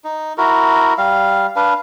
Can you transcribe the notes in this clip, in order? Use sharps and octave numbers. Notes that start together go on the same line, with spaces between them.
D#4
E4 F#4 A#4
G3 F5
D4 B4 F5